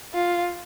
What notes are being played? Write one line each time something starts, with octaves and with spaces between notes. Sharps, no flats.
F4